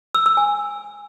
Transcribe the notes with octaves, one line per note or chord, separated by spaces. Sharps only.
E6
E6
G#5